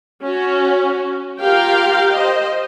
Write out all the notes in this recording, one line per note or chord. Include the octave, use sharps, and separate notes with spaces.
C#4 F#4
F4 G4 A#4 F5 G5
C5 D#5